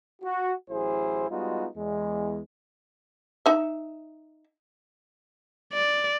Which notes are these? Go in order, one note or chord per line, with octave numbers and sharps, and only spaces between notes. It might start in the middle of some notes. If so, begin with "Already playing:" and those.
F#4
A1 F#3 E4 G#4 C5
G3 G#3 B3 D#4 F4 F#4
E2 G#3
D#4 E5
D5